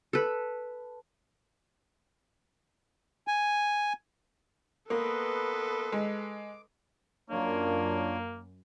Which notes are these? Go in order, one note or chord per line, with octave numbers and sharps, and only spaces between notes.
A4 B4
G#5
A#3 B3 A4 B4 D#5 C6
G#3 D6
F#2 A#3 D4 F4 A#4 C#5